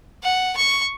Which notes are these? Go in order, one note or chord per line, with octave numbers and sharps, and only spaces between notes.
F#5
C#6